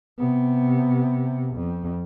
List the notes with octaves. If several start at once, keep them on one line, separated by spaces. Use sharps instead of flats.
C3 B3
F2